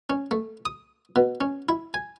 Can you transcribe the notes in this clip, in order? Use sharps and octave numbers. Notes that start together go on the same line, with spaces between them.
C#4
A3
D#6
B2
C#4
E4
G#5